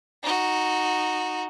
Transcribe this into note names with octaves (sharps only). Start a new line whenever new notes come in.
D#4 F#4